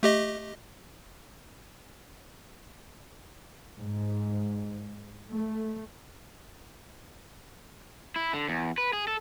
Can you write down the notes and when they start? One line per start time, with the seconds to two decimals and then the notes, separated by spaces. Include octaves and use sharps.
0.03 A3 G4 D#5
3.77 G#2
5.29 A3
8.16 E4
8.34 D3
8.49 E2
8.78 B4
8.93 G#4
9.08 A4